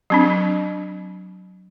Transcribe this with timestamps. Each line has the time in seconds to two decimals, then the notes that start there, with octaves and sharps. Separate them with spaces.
0.10 F#3 C4 D4